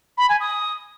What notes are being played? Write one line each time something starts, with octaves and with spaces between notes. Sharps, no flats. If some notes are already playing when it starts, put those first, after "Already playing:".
B5
G#5
D#6